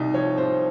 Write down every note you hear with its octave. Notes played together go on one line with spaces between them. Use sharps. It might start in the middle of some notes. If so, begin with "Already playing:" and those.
Already playing: C2 D#4
F3 C#5
C2 C5